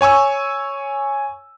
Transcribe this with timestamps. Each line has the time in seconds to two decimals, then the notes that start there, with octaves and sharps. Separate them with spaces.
0.01 C#5 G#5 C#6 E6